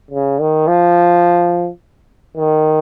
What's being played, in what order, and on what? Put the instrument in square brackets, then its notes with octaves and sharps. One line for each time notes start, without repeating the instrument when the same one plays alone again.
[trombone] C#3
D#3
F3
D#3